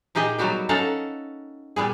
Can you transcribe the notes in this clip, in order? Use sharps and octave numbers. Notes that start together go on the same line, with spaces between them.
A#2 D#4 G4 G#4 D#5
F#3 G3 B3 F#4 G4
C#4 D#4 A4 F5 F#5 A#5
A#2 G3 B3 G#4